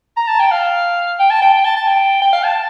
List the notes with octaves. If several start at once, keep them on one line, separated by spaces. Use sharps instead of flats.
A#5
A5
G5
F5
G5
A5
G5
G5
A5
A5
G5
G5
F5
A5